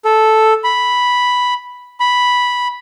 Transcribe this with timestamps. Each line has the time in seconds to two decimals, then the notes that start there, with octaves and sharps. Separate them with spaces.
0.05 A4
0.64 B5
2.00 B5